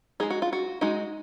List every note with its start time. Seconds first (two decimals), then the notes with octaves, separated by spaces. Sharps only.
0.20 G#3 D#4 G#4
0.30 F#4
0.42 F4
0.53 F#4
0.81 G#3 D#4 F#4